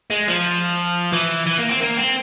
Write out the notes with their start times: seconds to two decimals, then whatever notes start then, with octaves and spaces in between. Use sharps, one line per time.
0.11 G#3
0.28 F3
1.13 E3
1.46 E3
1.58 A#3
1.69 C4
1.80 A#3
1.98 C4